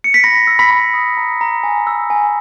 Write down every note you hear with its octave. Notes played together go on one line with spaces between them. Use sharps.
C#7
B6
B5 A#6
E6
B5 B6
B5
D#6
A#5
A#5
G#5
E6
G#5